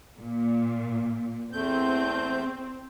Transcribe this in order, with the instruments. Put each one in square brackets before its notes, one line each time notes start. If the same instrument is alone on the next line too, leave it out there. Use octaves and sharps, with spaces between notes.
[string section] A#2
[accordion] E2 A3 G6 [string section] C4